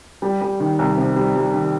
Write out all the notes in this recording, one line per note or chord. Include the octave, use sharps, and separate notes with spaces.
G3
G3
D#3
C2
C3
G3
G3
D#3